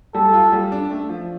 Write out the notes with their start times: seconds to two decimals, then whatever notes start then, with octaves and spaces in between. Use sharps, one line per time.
0.14 G3 A4
0.33 F4
0.52 G3
0.72 D4
0.91 A3
1.09 F3